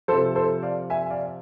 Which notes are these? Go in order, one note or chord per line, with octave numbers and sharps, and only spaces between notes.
C3 F3 A4 C5
A4 C5
D5 F5
E5 G#5
D5 F5